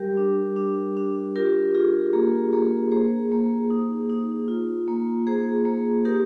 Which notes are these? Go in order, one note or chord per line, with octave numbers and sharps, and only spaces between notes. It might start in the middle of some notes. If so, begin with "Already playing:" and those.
Already playing: G3 G4 A#4
D4
D4
D4
F4 G4 A#4
F4 G#4
A#3 G#4
A#3 G#4
A#3 G#4 C5
A#3
D#4
D#4
F4
A#3
A#3 G#4 C5
A#3
D#4 G4 A#4